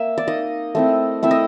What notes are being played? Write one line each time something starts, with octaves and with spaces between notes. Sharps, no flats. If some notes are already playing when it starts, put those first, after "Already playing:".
Already playing: A#3 E5
D5
A#3 D#4 D#5
A3 C4 E4
A3 C4 E4 E5
D#5